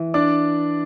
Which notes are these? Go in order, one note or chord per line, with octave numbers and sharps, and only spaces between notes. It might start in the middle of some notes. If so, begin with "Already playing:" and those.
Already playing: E3
D4 D5 D6